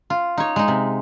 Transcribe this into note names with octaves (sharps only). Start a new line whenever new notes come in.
F4
D#4 C#5
G#3 D#4
C3